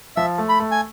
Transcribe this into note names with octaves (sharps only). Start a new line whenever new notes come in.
F3 E5
A3
B5
A3
G#5